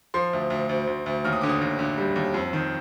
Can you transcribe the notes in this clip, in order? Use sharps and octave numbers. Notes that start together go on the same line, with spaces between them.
F3 C6
D2
D2
D2
D2
D2
D#2 F6
D#6
D3 D6
D#6
D#2
D3
G3
D#2
F2
D#3